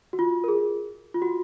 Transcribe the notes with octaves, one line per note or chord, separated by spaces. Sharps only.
F#4
F4
A#4
G#4
F4
F#4